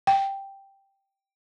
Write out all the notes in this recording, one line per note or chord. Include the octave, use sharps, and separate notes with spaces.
G5